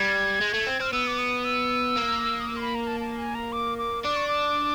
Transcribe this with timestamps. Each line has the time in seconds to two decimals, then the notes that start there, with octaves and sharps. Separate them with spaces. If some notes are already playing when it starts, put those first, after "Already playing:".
Already playing: G3 G#6
0.41 G#3
0.54 A3
0.67 C4
0.80 C4 F6
0.93 B3 E6
1.07 D6
1.18 D#6
1.45 E6
1.97 A#3
2.40 D#6
2.48 E6
2.56 C6
2.61 B5
2.75 A#5
2.87 A5
3.00 A5
3.18 G#5
3.35 A#5
3.52 D6
3.78 D6
4.04 D4 D6
4.16 C#6
4.28 D6